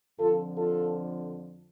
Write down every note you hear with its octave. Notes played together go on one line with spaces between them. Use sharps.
F2 D3 F3 F4 A4
F4 A4